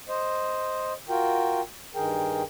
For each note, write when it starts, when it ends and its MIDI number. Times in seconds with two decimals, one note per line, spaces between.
0.09 0.93 72
0.09 0.93 75
1.09 1.61 65
1.09 1.61 66
1.09 1.61 70
1.09 1.61 79
1.95 2.43 43
1.95 2.43 51
1.95 2.43 68
1.95 2.43 70
1.95 2.43 79